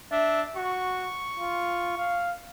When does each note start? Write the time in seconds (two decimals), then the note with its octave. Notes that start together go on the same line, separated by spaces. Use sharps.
0.11 D4 E5
0.56 F#4 C#6
1.40 F4
1.97 F5